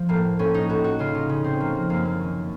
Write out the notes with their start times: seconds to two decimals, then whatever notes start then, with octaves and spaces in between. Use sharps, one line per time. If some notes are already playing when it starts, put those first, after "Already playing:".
Already playing: F3
0.09 A2 A#3
0.39 A2 C#4
0.54 D#4
0.69 A2 F#4
0.84 F#4
0.99 C#3 F4
1.15 D#4
1.29 C#3 C#4
1.44 C4
1.60 F3 A#3
1.75 A#3
1.90 F#2 A#3
2.05 A#3
2.20 D#3 C#4